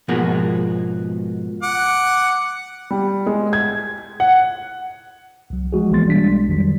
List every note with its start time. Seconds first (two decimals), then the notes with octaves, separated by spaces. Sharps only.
0.08 G#2 B2 F3 G#3 A#3 F#4
1.63 F#5 D6
2.91 G3
3.26 G#3
3.53 G#6
4.20 F#5
5.50 C2 F#3
5.72 F3 G#3 F#4 G#4
5.91 B1 E3 A#3 B3 C6 A6
6.06 B1 G3 G#3 D4 B6
6.48 F2 D#3 F#3 G3